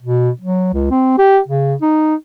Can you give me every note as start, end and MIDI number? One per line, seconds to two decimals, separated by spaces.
0.03 0.30 47
0.42 0.73 54
0.74 0.87 37
0.91 1.14 60
1.18 1.40 67
1.48 1.75 49
1.82 2.15 63